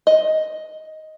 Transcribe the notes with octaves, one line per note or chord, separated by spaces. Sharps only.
D#5